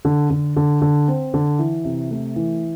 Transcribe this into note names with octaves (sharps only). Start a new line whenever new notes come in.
D3
D3
D3
D3
C4
D3
E3
C3
A3
E3